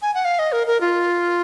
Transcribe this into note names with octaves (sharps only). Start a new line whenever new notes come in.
G#5
F#5
F5
D#5
A#4
A#4
F4